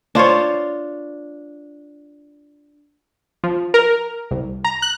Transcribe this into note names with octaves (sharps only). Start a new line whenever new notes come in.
D4 F4 C5 C#5
F3
A#4
C2
A#5
F#6